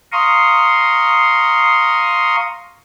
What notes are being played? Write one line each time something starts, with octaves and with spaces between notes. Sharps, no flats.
F5 A#5 C6 C#6 D#6